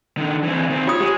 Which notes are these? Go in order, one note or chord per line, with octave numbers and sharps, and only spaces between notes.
D3 D#3
E3 C4
D#3 C4
F4 C#5 D#6
G#3 G4